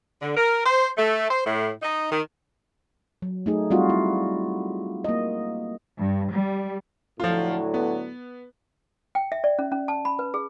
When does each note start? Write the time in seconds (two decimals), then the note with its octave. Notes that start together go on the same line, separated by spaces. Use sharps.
0.21 D3
0.36 A#4
0.66 C5
0.97 A3
1.30 C5
1.45 A2
1.82 D#4
2.11 D#3
3.22 F#3
3.46 A3 D#4 G#4
3.71 G3 C4 F4 F#4
3.89 E4
5.04 A#3 D#5
5.98 G2
6.32 G3
7.20 A2 D3 F3 F#3 F4
7.74 B3
9.15 G5
9.32 E5
9.44 D5
9.59 C#4
9.72 C#4
9.88 A5
10.05 B5
10.19 B4
10.34 G#4